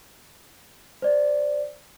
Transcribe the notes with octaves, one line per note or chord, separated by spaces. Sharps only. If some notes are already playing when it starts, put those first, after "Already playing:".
C5 D5